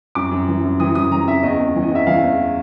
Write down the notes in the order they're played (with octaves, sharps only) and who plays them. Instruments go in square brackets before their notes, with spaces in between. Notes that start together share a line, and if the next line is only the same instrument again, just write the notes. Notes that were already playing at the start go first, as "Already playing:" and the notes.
[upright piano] F#2 D6
F#2
E3
F#2
E3 D#6
F#2 D#6
E3 A#5
C#3 E5
E2 D#5
E2
E3
D#5
E2 E5
E3 F5
E2